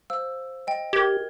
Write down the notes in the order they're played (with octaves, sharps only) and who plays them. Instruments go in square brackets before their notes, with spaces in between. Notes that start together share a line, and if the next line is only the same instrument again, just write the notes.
[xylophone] C5 F5 E6
D#5 G5
[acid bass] G4 [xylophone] A#4 G#6